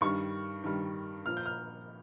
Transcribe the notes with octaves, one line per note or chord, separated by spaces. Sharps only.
G2 D#3 G3 C#6
G2 D#3 G3
A#2 F3 F6
G6
F6